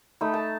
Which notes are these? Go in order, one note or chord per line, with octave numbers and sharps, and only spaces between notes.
A3 D#4 B5
A5